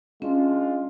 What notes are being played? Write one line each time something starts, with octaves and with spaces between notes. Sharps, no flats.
G#3 C#4 D4 F4